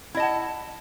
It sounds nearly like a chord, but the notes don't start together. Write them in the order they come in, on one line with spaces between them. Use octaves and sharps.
E4 D#5 A5 F#5